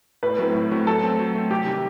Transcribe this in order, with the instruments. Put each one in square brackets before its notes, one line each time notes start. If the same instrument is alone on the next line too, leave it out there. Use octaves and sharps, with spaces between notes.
[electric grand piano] A2 [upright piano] B4
[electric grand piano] F#3 A3 C4 E4
A2
F#3 A3 C4 E4
[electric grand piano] F#3 [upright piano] A4
[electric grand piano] A3 C4
F#3
A3 C4
[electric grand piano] C3 [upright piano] G4
[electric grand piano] D#3 G3